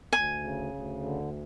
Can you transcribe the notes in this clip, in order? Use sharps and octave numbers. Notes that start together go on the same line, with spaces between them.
D2 G#5
C#3
D2
D3